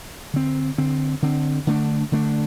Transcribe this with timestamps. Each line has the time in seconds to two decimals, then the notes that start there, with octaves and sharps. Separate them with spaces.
0.34 D3 C4
0.78 D3 C4
1.22 D3 C4
1.67 D3 A3 D4
2.12 D3 A3 D4